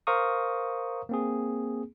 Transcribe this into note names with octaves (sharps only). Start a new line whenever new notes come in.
A#4 C5 F5 A#5 C#6 D#6
A#3 C4 G#4